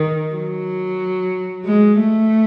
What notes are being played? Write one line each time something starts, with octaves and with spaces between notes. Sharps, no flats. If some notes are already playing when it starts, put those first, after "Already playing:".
Already playing: D#3
F#3
G#3
A3